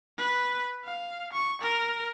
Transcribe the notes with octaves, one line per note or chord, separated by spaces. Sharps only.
B4
F5
C#6
A#4